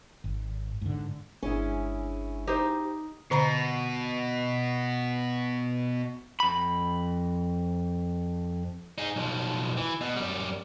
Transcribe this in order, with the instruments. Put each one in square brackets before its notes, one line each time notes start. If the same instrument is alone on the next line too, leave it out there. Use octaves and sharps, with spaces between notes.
[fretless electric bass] G#1
G#2 D3
[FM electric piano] G1 G#3 D4 [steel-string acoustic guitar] C#4 E4 G#4
[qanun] D#4 [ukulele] G4 C5
[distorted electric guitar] B2 [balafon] D3 A#5 B5
[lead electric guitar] F2 B5
[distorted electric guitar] D#4 G#4
B1 F3
E3
B2
F#2 G3